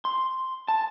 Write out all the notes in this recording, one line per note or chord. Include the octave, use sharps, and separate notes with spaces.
C6
A5